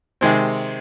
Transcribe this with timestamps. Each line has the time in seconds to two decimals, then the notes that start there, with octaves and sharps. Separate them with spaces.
0.21 C3 D#3 G#3 C4